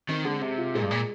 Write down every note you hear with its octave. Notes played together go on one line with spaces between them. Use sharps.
D#3 C4
D3 G#3
C3 G4
F4
A#2 G#3
G2
A#2